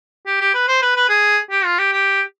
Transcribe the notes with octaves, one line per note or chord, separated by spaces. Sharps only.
G4
G4
B4
C5
B4
B4
G#4
G4
F4
G4
G4